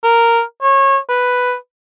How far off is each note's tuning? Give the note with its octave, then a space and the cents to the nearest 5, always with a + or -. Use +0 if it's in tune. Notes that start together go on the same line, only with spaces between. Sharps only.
A#4 -5
C#5 -25
B4 +5